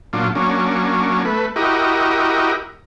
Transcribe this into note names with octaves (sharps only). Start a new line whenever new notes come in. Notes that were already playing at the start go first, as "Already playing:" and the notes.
A#2 F#3 D4 F4
F#3 A#3 C#4 D4
A3 B4
E4 F#4 G4 A#4 D#5